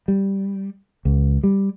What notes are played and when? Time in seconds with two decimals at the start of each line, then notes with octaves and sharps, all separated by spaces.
0.08 G3
1.05 C#2
1.43 G3